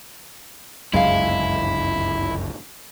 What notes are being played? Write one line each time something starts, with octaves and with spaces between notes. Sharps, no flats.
G1 C#2 F#2 G#3 E4 F5